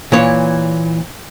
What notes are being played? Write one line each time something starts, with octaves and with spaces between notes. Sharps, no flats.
A#2 E3 C#5